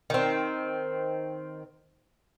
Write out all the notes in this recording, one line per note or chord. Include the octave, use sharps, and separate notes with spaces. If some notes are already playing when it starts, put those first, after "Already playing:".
D#3 C4